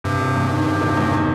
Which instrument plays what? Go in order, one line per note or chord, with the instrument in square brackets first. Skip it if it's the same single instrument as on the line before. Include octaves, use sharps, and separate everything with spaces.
[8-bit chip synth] G2 [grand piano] C3
[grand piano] E1
E2
D#3
C3
E1
E2
D#3